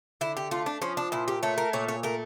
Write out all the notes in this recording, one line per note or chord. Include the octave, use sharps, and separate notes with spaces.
D3 E4
G4
A3 F4
D4
F3 C#4
D4
A#2 E4
G4
A3 C#5
A#4
A#2 C#5
C#5
A3 A#4